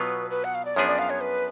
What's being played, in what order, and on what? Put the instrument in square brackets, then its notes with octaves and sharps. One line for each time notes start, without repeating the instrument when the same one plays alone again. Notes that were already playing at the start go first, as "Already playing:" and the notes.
Already playing: [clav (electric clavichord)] B2 F#3 B3 F4 [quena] B4
[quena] B4
F#5
F5
D5
[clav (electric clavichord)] F#2 F3 B3 D4 G#4 [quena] C#5
[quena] D5
F5
C#5
B4